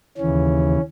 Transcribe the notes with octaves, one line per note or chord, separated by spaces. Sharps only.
D#2 C#3 E3 C#4